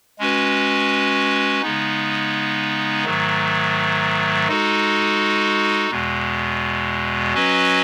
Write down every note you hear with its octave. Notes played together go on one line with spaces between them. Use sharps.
G#3 C#4 F#4 B4
C#3 G#3 B3 D#4
G#2 D#3 F#3 A3
G#3 D#4 F#4 A4
E2 B2 G#3
F#3 C#4 F#4 B4 D#5